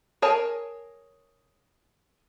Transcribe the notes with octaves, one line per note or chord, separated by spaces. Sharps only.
G#4 A#4 C#5 G#5 A5